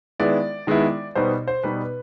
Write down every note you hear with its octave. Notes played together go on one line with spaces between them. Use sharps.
D#3 G#3 B3 E4 D5
D#3 G#3 B3 E4
B2 G3 B3 D#4 C5
C5
B2 G3 B3 D#4 B4